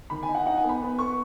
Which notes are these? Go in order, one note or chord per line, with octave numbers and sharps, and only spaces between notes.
D#3 B5
G#5
D#4
F#5
D#4 F#5
G#5
B3 B5
B3
B3 C#6